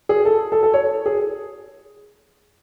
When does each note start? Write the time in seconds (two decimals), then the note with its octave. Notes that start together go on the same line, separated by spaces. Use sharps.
0.09 G#4
0.25 A4
0.52 A4
0.63 A4
0.74 C#5
1.06 G#4